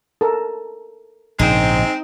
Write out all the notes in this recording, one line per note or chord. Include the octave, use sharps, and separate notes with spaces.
A4 A#4
A#1 G#2 C#3 G#3 C4 D#4